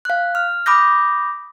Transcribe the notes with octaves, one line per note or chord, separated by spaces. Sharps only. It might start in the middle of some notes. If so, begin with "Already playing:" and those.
F5 F#6
F6
B5 D6 D#6 G6 A#6